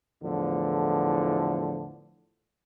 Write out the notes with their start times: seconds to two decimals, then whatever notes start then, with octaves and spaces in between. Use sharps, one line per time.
0.23 E2 A2 D3 F3